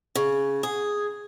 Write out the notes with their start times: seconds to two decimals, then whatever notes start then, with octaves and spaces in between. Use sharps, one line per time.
0.15 C#3
0.63 G#4